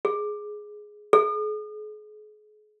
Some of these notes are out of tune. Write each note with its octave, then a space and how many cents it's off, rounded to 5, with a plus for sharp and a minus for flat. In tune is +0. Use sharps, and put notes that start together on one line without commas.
G#4 +10
G#4 +40